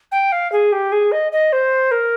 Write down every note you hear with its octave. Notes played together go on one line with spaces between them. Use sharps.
G5
F5
G#4
G4
G#4
D#5
D#5
C5
A#4